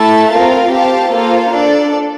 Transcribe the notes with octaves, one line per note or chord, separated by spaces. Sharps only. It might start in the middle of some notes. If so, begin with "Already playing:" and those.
Already playing: A3 E4 A4 E5 A5
C4 F4 A#4 F5
G4 C5 F5 A5
A#3 F4 A4 C5 F5
D4 A4 D5